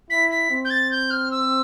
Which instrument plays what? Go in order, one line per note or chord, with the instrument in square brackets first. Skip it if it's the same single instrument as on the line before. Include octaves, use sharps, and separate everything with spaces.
[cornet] E4 [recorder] B6
[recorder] B6
[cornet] C4
[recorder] G6
A6
G6
F6
E6